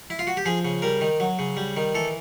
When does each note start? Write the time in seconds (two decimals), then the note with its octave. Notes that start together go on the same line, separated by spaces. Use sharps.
0.10 E4
0.19 F4
0.27 F#4
0.37 G4
0.46 F3 G#4
0.65 C#3
0.82 G3 A#4
1.01 D#3
1.20 F#3
1.39 C#3
1.57 G3
1.77 D#3
1.95 E3 A4